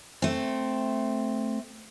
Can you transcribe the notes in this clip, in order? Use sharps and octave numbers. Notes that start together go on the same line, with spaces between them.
A3 C4